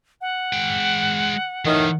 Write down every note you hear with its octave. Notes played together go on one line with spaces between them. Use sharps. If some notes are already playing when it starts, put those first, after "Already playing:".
F#5
G#3 G5
A2 D#3 E3 G3